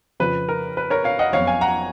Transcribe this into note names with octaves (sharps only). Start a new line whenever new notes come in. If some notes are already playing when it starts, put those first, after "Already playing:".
F2 C#3 F3 B4
A#4
B4
A#4 C#5
C#5 F5
D#5 F#5
F#1 F2 F3 B3 C#5 F5
F5 G#5
F#5 A#5